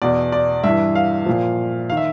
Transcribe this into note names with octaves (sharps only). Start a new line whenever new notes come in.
E2 B2 D5
D5
G2 E3 E5
F5
A#2 F3
D#3 F5
E5